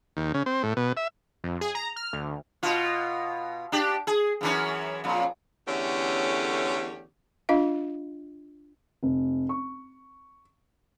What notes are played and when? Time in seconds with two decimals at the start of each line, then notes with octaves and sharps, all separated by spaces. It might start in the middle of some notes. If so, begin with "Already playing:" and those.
0.17 D#2
0.34 C#3
0.46 C4
0.63 A2
0.77 B2
0.97 E5
1.44 F2
1.61 G#4
1.75 A#5
1.96 F6
2.13 D2
2.63 B2 F4
3.72 D4 G4
4.07 G#4
4.41 F#2 E3 C#4
5.04 F2 A#2
5.67 E2 D3 A3 C#4 G4 C#5
7.49 D4 F4 D#5 F5
9.03 F1
9.49 C#6